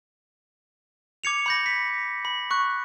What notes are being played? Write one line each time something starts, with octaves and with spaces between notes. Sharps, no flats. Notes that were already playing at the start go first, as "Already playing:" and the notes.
D6 G#6 C#7 F7
B5 G6 A#6
B6
B5
C#6 F#6